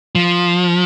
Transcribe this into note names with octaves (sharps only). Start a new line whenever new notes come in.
F3